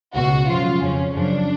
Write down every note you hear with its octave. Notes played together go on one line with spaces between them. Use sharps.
C#2 B2 F#4
F#2 C#3 F3 F4
F2 C#3 F3 C#4
F#2 C#3 F3 D4